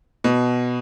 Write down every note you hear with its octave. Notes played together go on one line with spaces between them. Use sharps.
B2